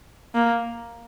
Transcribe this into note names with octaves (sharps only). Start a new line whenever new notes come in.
A#3